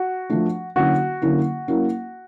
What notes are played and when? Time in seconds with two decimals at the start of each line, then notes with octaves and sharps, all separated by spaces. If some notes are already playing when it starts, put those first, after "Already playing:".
Already playing: F#4
0.30 F3 A3 D4
0.76 D3 F#3 A#3 C#4 E4 F#4
1.22 D3 F#3 A#3 C#4 E4
1.68 F#3 A#3 C#4 E4